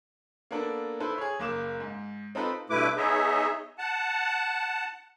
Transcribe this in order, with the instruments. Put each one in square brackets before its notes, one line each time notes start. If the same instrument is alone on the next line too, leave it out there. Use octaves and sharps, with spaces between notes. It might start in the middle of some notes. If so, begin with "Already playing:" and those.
[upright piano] A#3 B3 D4 A4
E4 A4 B4 C5
G#4 C#5
F#1 A#3 D6 E7
G#2
C4 D#4 F4 A4 B4
[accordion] G2 B2 A3 E4 B4 D6
B3 D#4 G#4 C#5 D#5 E5
F#5 A5